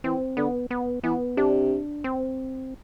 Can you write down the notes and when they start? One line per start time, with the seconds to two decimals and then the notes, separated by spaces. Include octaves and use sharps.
0.04 E3 C4
0.37 D3 B3
0.71 B3
1.04 E3 B3
1.37 C3 D4
2.04 C4